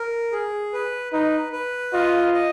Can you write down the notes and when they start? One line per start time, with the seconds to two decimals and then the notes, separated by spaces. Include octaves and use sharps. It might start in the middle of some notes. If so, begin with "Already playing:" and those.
Already playing: A#4
0.32 G#4
0.73 B4
1.13 D#4 B4
1.52 B4
1.93 F4 D#5
2.34 D#5